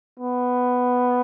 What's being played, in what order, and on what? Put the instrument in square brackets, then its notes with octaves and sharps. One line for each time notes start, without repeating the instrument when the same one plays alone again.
[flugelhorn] B3